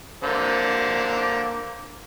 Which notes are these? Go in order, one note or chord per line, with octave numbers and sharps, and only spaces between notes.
D3 A#3 C5